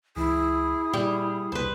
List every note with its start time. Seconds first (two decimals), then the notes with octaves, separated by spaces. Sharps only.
0.17 C#2 E3 E4 G#4
0.94 A#2 G3
1.52 E1 C2 D4 B4 C5